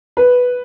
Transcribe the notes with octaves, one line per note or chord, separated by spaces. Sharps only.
B4